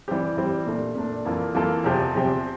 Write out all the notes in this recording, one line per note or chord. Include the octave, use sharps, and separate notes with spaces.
E3 G3 C4 G4
E3 G3 C4 G4
A#2 A3 D4
A#2 A3 D4
F2 E3 A#3 F4 A4
F2 E3 A#3 F4 A4
E2 C3 F3 C4 G4
E2 C3 F3 C4 G4